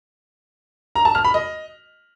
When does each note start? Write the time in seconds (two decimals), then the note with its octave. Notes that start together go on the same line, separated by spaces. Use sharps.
0.95 A#5
1.05 A5
1.15 F6
1.25 B5
1.34 D#5